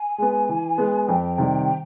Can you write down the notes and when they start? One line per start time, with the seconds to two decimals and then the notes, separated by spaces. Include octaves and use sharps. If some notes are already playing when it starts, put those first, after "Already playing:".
Already playing: G#5
0.18 G#3 B3
0.49 E3
0.78 G#3 B3
1.08 F2 G5
1.38 C3 D#3 G3